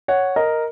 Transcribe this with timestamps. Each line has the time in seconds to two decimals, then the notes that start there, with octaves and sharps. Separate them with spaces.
0.08 C#5 F#5
0.36 A#4 D#5